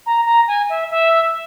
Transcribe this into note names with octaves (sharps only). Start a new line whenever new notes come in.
A#5
A#5
G#5
E5
E5